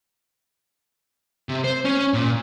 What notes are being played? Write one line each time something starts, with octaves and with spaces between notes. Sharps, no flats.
C3
C5
C#4
A#2